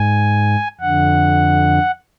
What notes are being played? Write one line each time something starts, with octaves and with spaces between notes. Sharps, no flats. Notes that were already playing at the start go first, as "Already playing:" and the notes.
Already playing: G#2 G#5
F2 D3 F#5